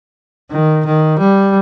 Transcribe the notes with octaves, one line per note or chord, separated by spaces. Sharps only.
D#3
D#3
G3